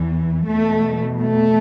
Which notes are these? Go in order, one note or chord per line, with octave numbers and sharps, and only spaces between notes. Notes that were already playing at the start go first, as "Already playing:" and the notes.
Already playing: E2 E3
E2 B2 A3
A3